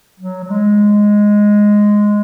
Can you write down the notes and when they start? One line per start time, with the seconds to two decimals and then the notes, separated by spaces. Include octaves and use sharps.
0.20 F#3
0.44 F#3
0.50 G#3